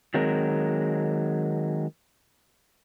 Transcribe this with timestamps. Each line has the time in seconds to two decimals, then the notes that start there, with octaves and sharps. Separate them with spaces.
0.14 D#3 F#3 G#3 C4 A#4